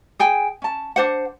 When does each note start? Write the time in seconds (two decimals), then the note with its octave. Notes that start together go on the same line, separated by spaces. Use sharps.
0.19 G#4 G5 G#5
0.62 C#4 A5
0.96 D4 C5 F#5